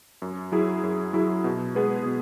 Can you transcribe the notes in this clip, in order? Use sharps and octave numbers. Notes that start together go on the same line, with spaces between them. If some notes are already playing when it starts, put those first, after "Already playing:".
F#2
F#3 E4 G#4
F#2
F#3 E4 G#4
B2
G#3 B3 G#4 B4
B2